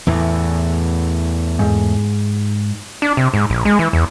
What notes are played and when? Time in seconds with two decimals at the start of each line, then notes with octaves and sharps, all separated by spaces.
0.07 E2 A2 E3
1.59 G#2
3.02 D4
3.17 C3
3.34 G#2
3.50 A#1
3.65 G#3
3.79 E3
3.93 E2